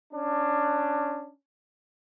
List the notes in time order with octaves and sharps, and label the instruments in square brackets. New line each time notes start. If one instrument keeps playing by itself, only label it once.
[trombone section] C#4 D4